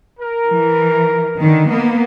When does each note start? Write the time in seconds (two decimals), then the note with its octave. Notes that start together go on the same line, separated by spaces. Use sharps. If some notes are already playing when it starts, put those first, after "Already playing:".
0.20 A#4
0.50 E3
1.41 D3 D#3
1.71 D#3 A#3 B3 D#5